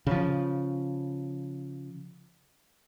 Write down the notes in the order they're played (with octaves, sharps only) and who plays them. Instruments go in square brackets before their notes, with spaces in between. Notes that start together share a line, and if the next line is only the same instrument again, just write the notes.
[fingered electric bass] C#3 F3